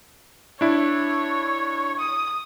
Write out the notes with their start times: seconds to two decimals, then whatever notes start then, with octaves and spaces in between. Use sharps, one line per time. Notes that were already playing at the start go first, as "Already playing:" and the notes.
0.61 D4 E4 C#5
1.99 D#6